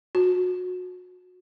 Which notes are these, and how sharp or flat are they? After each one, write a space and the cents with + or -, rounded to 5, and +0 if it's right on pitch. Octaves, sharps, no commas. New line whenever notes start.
F#4 -30